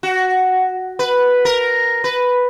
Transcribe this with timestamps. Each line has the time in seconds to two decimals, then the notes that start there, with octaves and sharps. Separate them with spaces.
0.03 F#4
0.99 B4
1.45 A#4
2.04 B4